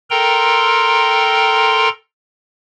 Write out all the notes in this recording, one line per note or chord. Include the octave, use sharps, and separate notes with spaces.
A4 A#4 G5 A#5 C6